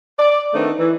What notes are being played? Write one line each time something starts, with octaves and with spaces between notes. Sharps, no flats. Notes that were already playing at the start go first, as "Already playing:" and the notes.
D5
D#3 A3 B3 C4 D4 D#4
E3